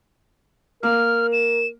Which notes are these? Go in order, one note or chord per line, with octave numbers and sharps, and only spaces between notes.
A#3 A#4 F6
E7